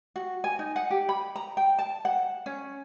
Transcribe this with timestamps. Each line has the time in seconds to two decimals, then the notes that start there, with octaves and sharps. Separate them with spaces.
0.16 F#4
0.44 G#5
0.59 D#4
0.76 F#5
0.91 G4
1.09 B5
1.36 A#5
1.57 G5
1.79 A5
2.05 F#5
2.46 C#4